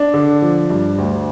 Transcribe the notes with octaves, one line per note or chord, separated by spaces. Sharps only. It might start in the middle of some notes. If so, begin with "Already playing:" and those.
Already playing: D4
D3
F3
G2
D2